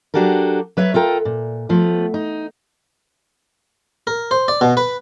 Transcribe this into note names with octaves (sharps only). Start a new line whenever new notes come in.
F#3 D4 F#4 G4 A4 A#4
F#3 B4 C#5 E5
F4 A4 A#4 G5
A#2
F3 A3 B3
D#4
A#4
C5
D5
B2
B4